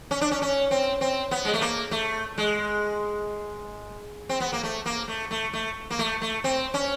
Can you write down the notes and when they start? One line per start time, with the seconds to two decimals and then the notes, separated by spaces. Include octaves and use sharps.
0.11 C#4
0.21 D4
0.31 C#4
0.42 C#4
0.71 C4
1.01 C4
1.31 B3
1.45 G#3
1.53 A3
1.61 A#3
1.91 A3
2.38 G#3
4.29 C4
4.40 B3
4.53 A#3
4.63 A3
4.86 A#3
5.08 A3
5.31 A3
5.53 A3
5.90 A#3
5.99 A3
6.22 A3
6.44 C4
6.74 C#4